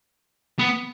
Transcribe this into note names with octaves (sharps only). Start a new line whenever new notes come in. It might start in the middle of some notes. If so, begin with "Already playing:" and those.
B3